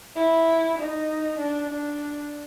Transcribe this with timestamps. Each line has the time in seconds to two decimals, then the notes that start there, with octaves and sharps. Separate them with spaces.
0.16 E4
0.78 D#4
1.39 D4
1.70 D4